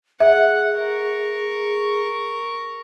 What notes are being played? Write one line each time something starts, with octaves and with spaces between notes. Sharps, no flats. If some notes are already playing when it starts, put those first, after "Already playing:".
G#4 E5 F#5
A#4 C#6